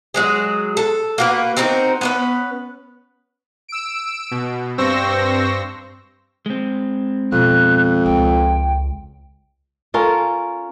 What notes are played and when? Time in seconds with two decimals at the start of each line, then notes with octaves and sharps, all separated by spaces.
0.14 F#3 G#3 G#4
0.77 A4
1.18 A#3 F#4 B4
1.57 C4 D#4 F#4 A#4
2.01 B3 C#4 B4
3.69 E6 D7
4.31 B2
4.78 G2 C4 C5 C#6 E6 A#6
6.46 G#3 C4
7.32 F2 B2 F#6
8.06 C#2 G5
9.94 C#4 F4 A4 A#4